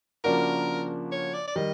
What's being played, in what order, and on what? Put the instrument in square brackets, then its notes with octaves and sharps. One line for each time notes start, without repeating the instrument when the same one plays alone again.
[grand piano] C#3 F3 A#3 D4 F#4 [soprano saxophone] A#4
[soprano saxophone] C#5
D5
D5
[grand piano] D#3 G3 [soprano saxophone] D#5